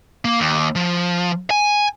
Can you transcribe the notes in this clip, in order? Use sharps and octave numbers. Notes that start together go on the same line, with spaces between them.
A#3
D#2
F3
G#5